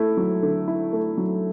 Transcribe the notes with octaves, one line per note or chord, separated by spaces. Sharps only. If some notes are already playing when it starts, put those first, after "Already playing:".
Already playing: A3 E4
F#3
D3
E4
A3
F#3